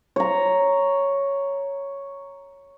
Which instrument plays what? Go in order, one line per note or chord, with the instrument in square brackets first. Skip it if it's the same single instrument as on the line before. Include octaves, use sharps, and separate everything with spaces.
[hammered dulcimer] C#5 A#5